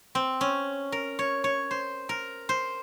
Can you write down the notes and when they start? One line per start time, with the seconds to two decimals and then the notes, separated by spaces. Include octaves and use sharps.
0.15 C4
0.41 C#4
0.92 A#4
1.19 C#5
1.44 C#5
1.71 C5
2.09 A#4
2.49 C5